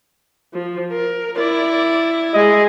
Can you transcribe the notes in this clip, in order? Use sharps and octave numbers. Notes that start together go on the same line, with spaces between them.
F3
A#4
E4 D5
G#3 G#4 D#5